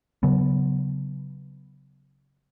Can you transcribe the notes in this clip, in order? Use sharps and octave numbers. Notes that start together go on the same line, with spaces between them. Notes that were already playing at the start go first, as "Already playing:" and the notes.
C#3 F#3 B3